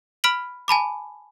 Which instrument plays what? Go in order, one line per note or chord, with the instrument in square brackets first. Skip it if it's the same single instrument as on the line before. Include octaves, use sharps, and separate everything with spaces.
[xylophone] B5 F6 B6 D7 F#7
G#5 A5 B5 D6